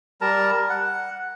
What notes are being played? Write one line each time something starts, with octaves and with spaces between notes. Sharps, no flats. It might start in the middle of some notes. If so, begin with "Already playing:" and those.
G3 A#4 A5 A#5
F#5